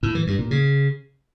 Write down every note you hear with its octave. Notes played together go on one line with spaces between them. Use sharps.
A2
E3
G2
A#2
C#3